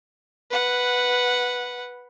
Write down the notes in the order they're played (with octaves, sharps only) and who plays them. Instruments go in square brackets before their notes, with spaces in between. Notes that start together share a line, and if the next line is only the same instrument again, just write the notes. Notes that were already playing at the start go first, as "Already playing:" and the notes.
[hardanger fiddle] B4 F#5